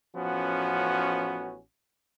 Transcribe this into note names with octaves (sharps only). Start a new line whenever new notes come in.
A1 F3 B3 C#4 F#4